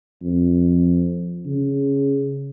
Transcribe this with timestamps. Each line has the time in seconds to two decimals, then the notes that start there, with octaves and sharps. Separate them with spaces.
0.22 F2
1.46 C#3